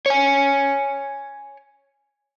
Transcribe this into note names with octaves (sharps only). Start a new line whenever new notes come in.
C#5 G#5